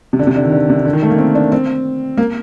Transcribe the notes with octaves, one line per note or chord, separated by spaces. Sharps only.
C3
D3
C3
D3
D#3
D3
C3
D3
D#3
A3
A#3
C4
D4
C4
A#3